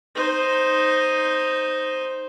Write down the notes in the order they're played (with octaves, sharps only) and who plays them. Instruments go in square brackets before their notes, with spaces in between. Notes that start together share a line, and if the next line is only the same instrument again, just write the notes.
[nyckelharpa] D#4 C5